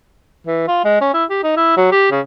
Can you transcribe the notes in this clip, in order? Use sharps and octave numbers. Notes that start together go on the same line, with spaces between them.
E3
F4
G#3
C#4
E4
G4
D#4
E4
F#3
G4
C#3